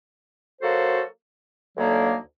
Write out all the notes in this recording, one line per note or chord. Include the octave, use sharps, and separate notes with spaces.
F#3 A#3 F#4 A4 C5
D2 D3 F#3 A#3 D#4